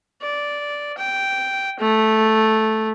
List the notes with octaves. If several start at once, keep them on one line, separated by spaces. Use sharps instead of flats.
D5
G5
A3